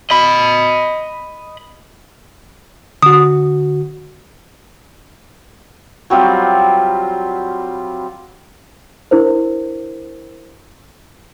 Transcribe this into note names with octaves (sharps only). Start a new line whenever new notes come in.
D#5 B5
D3 F#4 D#6
F#3 G3 C4 F4
D4 E4 A#4 C5